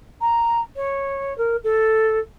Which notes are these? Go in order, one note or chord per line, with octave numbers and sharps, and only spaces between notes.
A#5
C#5
A#4
A4